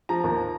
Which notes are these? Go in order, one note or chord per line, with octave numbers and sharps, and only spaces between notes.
F3 A#5
D#2